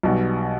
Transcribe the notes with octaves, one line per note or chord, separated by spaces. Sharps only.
B1 B2 G3